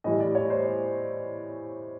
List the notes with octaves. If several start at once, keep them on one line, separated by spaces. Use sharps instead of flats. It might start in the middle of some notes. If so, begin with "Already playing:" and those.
A2 E3 G3 D#5
D5
C#5
C5